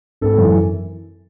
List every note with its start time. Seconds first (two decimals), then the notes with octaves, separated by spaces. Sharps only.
0.21 G#1 A4
0.38 F#2 E3